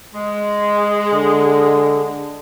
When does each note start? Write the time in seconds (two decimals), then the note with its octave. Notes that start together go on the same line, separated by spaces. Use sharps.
0.15 G#3
1.13 D3